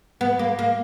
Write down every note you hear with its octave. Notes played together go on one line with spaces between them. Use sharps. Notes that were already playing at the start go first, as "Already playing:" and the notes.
B3
A#3
A#3